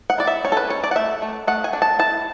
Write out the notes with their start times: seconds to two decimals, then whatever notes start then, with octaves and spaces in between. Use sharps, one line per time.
0.10 F#5
0.18 E4 D5
0.27 E5
0.44 C#4 C#5
0.52 A4
0.57 B4
0.70 C#4 C#5
0.84 D5
0.91 F#5
0.96 A3 E5
1.22 A3
1.47 A3 F#5
1.64 G#5
1.73 D4
1.82 A5
1.99 E4 A5